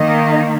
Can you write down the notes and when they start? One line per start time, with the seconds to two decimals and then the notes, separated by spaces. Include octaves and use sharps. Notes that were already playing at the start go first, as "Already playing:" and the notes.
Already playing: D#3 A#3 D#5